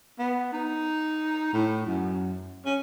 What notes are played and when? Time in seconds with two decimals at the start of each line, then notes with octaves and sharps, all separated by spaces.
0.19 B3
0.53 D#4
1.53 A2
1.87 F#2
2.66 C#4